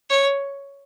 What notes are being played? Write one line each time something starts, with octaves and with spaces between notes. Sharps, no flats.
C#5